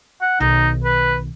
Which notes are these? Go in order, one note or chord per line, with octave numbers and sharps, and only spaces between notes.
F#5
B1 D#3 D#4
B4